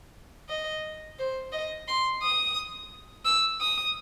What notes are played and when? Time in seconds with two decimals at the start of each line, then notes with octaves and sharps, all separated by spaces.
0.49 D#5
1.19 C5
1.52 D#5
1.88 C6
2.23 D#6
3.25 E6
3.61 D#6